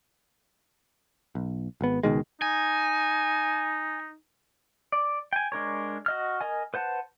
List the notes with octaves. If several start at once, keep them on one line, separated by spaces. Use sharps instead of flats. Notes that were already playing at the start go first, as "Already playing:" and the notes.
B1
G#1 B3
C#2 B2 D#3 G#3
D#4 G#5
D5
G5 G#5
G#3 D4 A#4 C#5
F#4 D#5 F6
A#4 D#5 G#5
B4 C5 F#5 A5